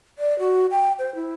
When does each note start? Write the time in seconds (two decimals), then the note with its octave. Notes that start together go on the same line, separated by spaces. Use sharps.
0.19 D5
0.39 F#4
0.71 G5
0.99 C5
1.15 E4